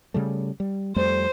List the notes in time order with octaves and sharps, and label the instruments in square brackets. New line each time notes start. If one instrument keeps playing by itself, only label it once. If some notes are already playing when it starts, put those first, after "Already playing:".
[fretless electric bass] C#3 G3 A3
G3
[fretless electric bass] F2 G3 A3 [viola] C5